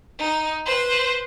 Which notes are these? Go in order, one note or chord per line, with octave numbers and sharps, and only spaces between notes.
D#4
B4 C5